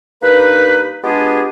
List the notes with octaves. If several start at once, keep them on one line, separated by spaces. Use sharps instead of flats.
G2 A#3 D#4 B4
G#3 B3 D4 F4 G4 G#4